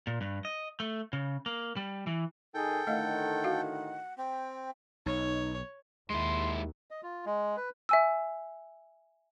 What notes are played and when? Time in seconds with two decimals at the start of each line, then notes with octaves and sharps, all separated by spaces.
0.07 A#2
0.21 G2
0.45 D#5
0.80 A3
1.13 C#3
1.46 A#3
1.77 G3
2.07 E3
2.54 D#3 G#4 A4 G5
2.87 A2 D3 D#3 A3 D#5 F5 F#5
3.44 F#4 E5 F5
4.18 C4 G5
5.06 B1 D#4 C#5
6.10 D#2 G#3 E4 C6
6.91 D#5
7.03 F4
7.26 G#3
7.57 B4
7.89 E5 G#5 E6